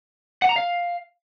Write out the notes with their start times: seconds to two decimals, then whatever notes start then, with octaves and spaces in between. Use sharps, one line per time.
0.42 F#5
0.49 A#5
0.56 F5